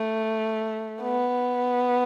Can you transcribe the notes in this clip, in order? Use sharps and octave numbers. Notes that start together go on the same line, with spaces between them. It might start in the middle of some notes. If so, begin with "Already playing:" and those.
Already playing: A3
B3